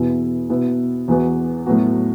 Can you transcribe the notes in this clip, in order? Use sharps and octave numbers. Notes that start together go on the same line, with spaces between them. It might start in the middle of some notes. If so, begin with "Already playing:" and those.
Already playing: E2 B2 B3 E4
B2 B3 E4
E2 E3 B3 F#4
A2 F#3 B3 F#4